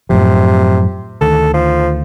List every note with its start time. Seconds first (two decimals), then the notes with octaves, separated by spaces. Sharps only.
0.10 F#2 A2 C3 F3
1.21 D2 D#3 A4
1.54 F3